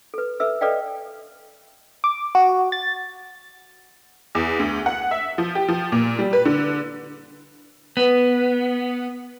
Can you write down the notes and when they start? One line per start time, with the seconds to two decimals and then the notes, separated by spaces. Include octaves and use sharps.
0.14 A4 B4
0.40 A4 B4 E5 E6
0.61 A4 B4 D5 D#5 F5 G5
2.04 D6
2.35 F#4
2.72 A6
4.35 E2
4.59 D2
4.86 F#5
5.11 E5
5.38 F3
5.55 G4
5.68 F3
5.92 A#2
6.19 G3
6.33 B4
6.45 D3
7.97 B3